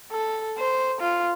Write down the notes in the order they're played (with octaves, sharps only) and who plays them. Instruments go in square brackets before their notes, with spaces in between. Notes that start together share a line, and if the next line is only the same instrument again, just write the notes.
[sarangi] A4
C5
F4